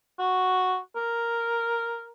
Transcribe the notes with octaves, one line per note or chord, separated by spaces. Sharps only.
F#4
A#4